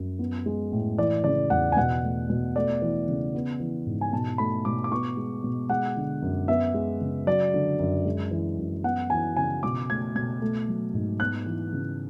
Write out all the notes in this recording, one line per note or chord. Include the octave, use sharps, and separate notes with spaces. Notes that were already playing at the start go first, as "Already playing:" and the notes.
Already playing: F#2
B3
G#3
A2
E3 D5
C#3 D5
E2 F#5
G#5
B2 F#5
A3
B2
A3 D5
E3
C#3
B3
E3
G#2
G#5
B2 A5
A3 B5
B2 D6
D6
B3 C#6
G#3
B2
G#3 F#5
D3
F#2
B3 E5
G#3
C#3
F#3 D5
D3
F#2
G#3
E3
F#2
B3 F#5
E3 G#5
C#3 G#5
B2 D6
A3 G#6
B2 G#6
A3
F#3
G#2
B3 F#6
E3
C#3